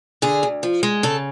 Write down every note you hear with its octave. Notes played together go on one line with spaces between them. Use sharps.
D3 G#4
D2
F3
G#3
C#3 A4